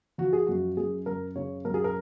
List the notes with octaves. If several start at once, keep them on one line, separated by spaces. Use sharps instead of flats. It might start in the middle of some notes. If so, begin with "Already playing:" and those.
F3 F#4
G#4
F#2 F#4
F#2 G#4
F#2 A#4
C#3 C#5
F#2 A#4
G#4
A#4